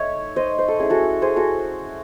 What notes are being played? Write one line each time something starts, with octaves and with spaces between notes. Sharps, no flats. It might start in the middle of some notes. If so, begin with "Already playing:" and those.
Already playing: A3 D#4 C#5 E5
C5 D#5
C5
A4
A3 C#4 E4 G#4
F#4 A4
G#4 C5
F#4 A4